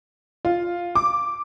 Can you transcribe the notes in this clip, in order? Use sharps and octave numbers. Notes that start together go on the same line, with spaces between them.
F4
D6